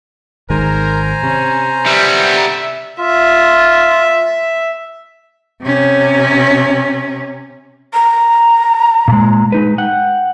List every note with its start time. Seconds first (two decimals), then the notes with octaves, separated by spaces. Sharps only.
0.50 G#1 D#3 G#3 A#4 C5 G#5 A#5
1.23 C3 C#4
1.86 G3 B3 E5
3.00 F4 E5
5.63 C3 C#4
7.93 A#5
9.08 A#2 G#3
9.52 G#3 D#4 B4
9.78 F#5 G5